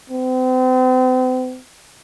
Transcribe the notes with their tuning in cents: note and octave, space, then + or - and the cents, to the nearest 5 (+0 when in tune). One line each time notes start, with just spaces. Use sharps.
C4 -40